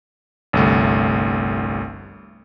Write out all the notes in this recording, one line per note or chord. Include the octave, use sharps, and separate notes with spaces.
G1 C2 A3